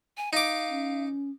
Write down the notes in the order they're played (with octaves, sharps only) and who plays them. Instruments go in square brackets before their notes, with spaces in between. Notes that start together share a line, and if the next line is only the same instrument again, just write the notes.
[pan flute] G#5
[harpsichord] D#4 D6 [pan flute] F5
[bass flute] C#4